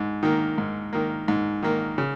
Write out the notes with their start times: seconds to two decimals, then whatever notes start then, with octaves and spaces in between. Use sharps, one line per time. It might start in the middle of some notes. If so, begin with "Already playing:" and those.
Already playing: G#2
0.23 D#3 A#3
0.58 G#2
0.93 D#3 A#3
1.28 G#2
1.63 D#3 A#3
1.98 C#3